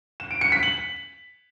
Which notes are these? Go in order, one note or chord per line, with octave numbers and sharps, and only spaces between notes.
E7
D7
C#7
B6
F#7